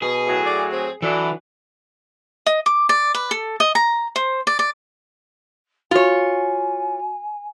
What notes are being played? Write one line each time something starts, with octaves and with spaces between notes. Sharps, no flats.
B2 G#4
A2 F#3
D5
C4
E3 F#3 D4 A4
D#5
D6
D5
B4
A4
D#5
A#5
C5
D5
D5
F4 F#4 C#5 G#5